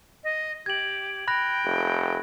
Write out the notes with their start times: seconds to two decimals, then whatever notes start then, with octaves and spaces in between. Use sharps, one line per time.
0.24 D#5
0.66 G4 G#6 F#7
1.28 G5 B5 F#6 A#6
1.65 F1